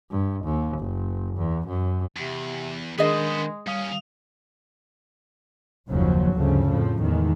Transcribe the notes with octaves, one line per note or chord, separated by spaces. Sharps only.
G2
D#2
F#1
E2
F#2
E2 C3
D#3 G#3 B3 D4 G#4 A#4 C5 D#5
D#2 G3 C#4 F5 D#6
F#1 D#2 C#3 F3 F#3
D2 G2 C#3 F3 A3
F2 A2 F3
E2 D#3 G#3